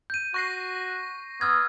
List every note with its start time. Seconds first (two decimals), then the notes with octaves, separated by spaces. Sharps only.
0.10 G6 D#7
0.34 F#4 C#6 A#6 C7
1.41 B3 E6 F6 G#6